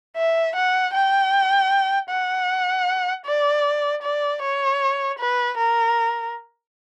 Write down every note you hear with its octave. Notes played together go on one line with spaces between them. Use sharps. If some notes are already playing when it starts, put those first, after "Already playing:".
E5
F#5
G5
F#5
D5
D5
C#5
B4
A#4